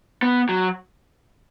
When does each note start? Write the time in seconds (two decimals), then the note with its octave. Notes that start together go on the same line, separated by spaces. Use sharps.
0.22 B3
0.49 F#3